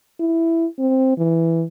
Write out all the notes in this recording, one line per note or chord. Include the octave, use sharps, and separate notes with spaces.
E4
C4
E3